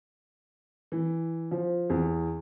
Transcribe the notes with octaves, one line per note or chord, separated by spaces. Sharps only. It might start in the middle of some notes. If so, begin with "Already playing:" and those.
E3
F3
E2